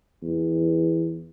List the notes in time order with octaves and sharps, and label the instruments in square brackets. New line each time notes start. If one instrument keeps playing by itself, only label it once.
[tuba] E2